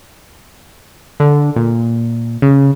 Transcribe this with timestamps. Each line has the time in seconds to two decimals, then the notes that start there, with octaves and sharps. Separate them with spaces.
1.20 D3
1.56 A#2
2.42 C#3